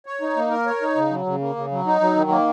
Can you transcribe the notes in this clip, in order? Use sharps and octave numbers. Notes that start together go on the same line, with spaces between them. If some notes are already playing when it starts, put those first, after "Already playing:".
C#5
D#4
A#3
A#4
C#5
D#4
C#3
F#3
C#3
A#3
C#3
F#3
D#4
F#3
D#3
A#3